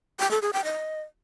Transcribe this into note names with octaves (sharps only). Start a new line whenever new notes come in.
G5
A4
G#4
G5
D#5